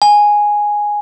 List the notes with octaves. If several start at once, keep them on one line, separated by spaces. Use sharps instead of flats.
G#5